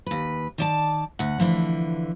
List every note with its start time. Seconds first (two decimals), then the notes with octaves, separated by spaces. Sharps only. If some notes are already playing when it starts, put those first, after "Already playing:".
0.06 D#2 B4
0.58 D#3 D5 A5
1.19 D2 F#5
1.40 D3 E3 F3